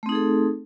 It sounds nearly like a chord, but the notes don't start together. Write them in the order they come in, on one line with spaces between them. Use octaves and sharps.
A3 C4 D#4 G#4 A4